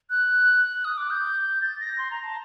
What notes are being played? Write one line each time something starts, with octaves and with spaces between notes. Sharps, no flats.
F#6
D#6
D6
G6
A6
A#6
C6
A#5
A5